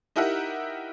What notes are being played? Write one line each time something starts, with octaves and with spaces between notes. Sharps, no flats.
D#4 E4 G4 A#4 E5 F#5